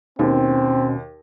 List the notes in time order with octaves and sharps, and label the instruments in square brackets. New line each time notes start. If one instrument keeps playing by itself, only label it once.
[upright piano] D#2 [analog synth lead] B2 [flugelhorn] C4 [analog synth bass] C#4